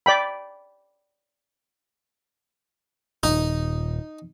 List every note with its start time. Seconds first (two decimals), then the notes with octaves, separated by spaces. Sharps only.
0.06 D5 G5 B5
3.23 D#1 G#1 D#4